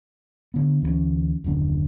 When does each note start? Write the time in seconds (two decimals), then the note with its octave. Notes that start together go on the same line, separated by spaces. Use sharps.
0.54 D3 B3
0.82 D2 E3 G3 C#4
1.44 D#1 F#2 D3 D4